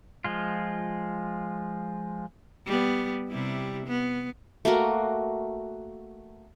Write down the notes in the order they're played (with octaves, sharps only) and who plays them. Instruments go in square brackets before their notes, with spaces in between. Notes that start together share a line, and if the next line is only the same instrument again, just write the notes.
[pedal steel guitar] F3 G#3 F4
[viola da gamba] G3 B3
C3 G3 E4
B3
[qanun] A3 A#3 F#4 A#4